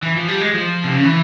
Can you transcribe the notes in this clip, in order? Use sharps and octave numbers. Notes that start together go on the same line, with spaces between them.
E3
F3
G3
G#3
F3
C3
C#3
E3